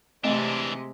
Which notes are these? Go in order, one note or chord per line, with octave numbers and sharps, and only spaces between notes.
C3 E3 G#3 A3 C4 D4 D#5